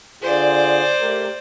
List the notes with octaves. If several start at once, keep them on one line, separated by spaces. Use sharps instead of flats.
D3 F4 G#4 C5 D5
A3 G4 A#4